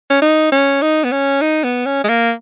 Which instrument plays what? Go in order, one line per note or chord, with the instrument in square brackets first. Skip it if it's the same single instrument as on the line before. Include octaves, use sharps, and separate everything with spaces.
[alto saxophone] C#4
D#4
C#4
D#4
B3
C#4
D#4
B3
C#4
G#3
A#3